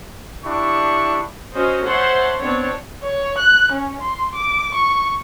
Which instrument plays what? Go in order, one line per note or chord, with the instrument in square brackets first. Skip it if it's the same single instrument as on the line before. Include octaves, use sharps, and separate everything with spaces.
[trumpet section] D4 E4 G4 C#6
[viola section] C#4 F#4 C5 D#5
C5 C#5 E5 F#5 A5 C6
B3 C4 D4 C#5
[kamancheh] C#5
F#6
C#4
C6
D6
C#6